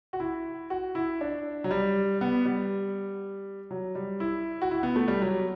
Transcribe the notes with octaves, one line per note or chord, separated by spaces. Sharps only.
F#4
E4
F#4
E4
D4
F#3
G3
B3
G3
F#3
G3
E4
F#4
E4
B3
A3
G3
F#3